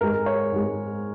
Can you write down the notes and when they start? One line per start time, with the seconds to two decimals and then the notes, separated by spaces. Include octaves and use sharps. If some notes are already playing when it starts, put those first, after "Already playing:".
0.01 G#2 G#3 A#4
0.26 C#5
0.52 G#2 G#3